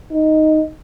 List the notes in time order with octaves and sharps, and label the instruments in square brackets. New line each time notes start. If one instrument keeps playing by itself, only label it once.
[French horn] D#4